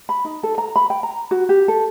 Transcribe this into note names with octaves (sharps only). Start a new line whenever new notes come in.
B5
D#4
A4
A#5
B5
G5
A#5
F#4
G4
A4